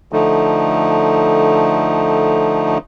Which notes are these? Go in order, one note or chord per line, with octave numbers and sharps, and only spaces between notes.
D3 F3 A3 D#4